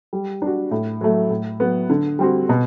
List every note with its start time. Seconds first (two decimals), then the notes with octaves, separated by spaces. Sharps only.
0.13 G3
0.42 D4 F#4
0.71 A2
1.01 F#3 A3
1.30 A2
1.60 F#3 B3
1.90 D3
2.19 G3 C4 F#4
2.49 B2